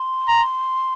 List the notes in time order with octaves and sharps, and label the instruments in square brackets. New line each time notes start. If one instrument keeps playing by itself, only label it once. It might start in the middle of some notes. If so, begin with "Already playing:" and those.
Already playing: [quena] C6
[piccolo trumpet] A#5